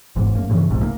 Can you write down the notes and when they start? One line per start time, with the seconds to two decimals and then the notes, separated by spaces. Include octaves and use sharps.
0.16 G1 E2 G#2
0.35 F#2 A#3
0.49 E2 G2 C#3 E3
0.70 F1 B1 G#2 C3
0.83 A#3